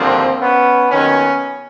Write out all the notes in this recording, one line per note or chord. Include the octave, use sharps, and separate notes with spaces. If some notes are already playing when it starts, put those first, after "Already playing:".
Already playing: G#1 G2 D3 F3 A#3 C4
B3 C#4
D#2 D#3 F#3 B3 C#4